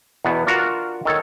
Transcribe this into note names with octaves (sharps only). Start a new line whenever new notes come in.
E2 B2 B3
D4 F4 F#4 A#4
D#3 A4 C#5